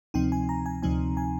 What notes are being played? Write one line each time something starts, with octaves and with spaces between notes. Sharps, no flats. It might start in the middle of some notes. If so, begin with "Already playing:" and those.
D2 C3 F3 C4 D#4 G5
G#5
A#5
G#5
D2 C3 F3 C4 D#4 G#5
G#5